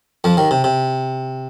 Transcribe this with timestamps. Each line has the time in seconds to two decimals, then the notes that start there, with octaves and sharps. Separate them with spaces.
0.24 F2 F3
0.37 D#2 D#3
0.51 C3
0.64 C3